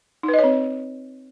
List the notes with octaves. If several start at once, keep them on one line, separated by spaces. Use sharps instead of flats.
D#4
B4
D#5
C#5
C4